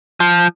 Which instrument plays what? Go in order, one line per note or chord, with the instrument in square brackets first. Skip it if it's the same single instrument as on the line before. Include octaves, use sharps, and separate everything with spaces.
[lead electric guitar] F3